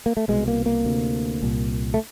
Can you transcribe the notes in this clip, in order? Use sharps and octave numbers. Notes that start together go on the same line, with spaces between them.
A#3
A3
C2 B2 G#3
A#3
A#3
D2 C3
C2 A#2
A3